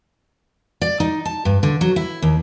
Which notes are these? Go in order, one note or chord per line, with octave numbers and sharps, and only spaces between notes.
D5
D#4
A5
G2
D3
F#3
E4
D#2